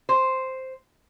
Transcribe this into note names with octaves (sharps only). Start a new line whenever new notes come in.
C5